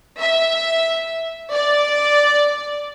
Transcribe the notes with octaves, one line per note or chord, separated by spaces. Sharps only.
E5
D5